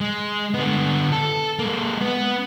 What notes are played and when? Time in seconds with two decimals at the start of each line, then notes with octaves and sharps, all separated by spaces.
0.01 G#3
0.54 D3 B3
1.12 A4
1.59 G#3 A#3
2.01 B3